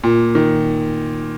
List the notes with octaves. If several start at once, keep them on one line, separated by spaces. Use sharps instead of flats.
A#2
D#3